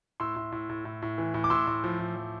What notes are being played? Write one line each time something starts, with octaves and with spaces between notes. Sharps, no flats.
A2 C6 E6
A2
A2
A2
A2
A2
E3
A2
D6
A2 C6 E6
A2
F3
A2
F3